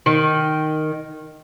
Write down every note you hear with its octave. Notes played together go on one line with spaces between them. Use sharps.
D#3